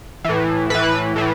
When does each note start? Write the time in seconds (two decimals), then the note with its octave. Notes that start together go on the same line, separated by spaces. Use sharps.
0.24 A2 E3
0.70 A2 E3 B4
1.16 A2 E3